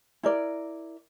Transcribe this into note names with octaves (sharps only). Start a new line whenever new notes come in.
E4 A#4 D5